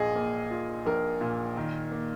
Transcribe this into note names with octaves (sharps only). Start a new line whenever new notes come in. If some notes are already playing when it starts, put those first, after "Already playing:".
Already playing: A#1 A#2 A#3 G#4 D#5
A#3
F4
A#1 A#4
A#2
D#3
A#3